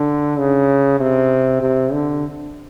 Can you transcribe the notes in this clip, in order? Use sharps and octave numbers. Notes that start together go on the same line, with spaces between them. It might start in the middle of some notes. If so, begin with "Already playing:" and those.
Already playing: D3
C#3
C3
C3
D3